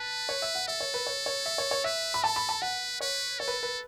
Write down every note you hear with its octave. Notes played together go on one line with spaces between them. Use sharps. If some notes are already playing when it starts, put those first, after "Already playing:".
Already playing: B4 A5
C#5
E5
F#5
A4 E5
C#5
B4
C#5
C#5
E5
C#5
C#5
B4 E5
B5
A4 A5
B5
A5
B4 F#5
B4 C#5
A4 C#5
B4
B4